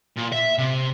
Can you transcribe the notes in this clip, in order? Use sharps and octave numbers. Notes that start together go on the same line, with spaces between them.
A#2
E5
C3